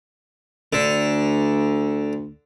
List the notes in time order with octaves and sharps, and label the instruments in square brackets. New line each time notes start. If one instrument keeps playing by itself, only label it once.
[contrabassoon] D2 [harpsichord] D3